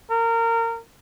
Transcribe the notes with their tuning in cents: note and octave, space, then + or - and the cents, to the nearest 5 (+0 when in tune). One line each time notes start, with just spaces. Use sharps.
A#4 -25